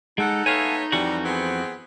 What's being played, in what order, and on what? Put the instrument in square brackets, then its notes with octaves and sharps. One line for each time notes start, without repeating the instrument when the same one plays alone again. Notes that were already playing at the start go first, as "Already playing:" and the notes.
[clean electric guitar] G#3 [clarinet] D#4 [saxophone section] A4 F#5
[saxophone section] A3 B3 C#5 [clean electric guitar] A4 F5 G#5
[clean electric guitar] F2 E3 F#4 [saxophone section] G3
[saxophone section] B3 C4 G#4